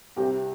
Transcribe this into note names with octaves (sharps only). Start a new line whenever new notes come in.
C2 C3 G3 G4